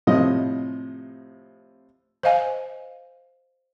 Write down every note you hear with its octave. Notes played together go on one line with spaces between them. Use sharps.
A2 C3 F3 D#5
C5 D#5 F5 G#5